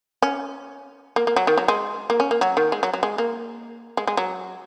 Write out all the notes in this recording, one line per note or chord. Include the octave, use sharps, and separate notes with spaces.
C#4
A#3
A#3
F#3
D#3
F#3
G#3
A#3
C#4
A#3
F#3
D#3
G#3
F#3
F#3
G#3
A#3
G#3
G#3
F#3